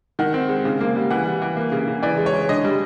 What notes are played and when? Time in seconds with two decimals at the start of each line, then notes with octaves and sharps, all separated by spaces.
0.19 D#3 F#5
0.34 C4
0.49 G#3
0.65 C#3
0.81 A#3
0.96 G3
1.11 E3 F#5
1.26 G3
1.42 E3
1.57 A#3
1.72 C#3
1.88 C#3
2.03 E3 D5
2.18 G#3
2.26 C#5
2.34 G#3
2.49 D3 D#5
2.64 G3